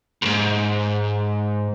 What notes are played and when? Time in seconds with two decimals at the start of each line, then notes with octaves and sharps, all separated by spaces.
0.22 D#2 G#2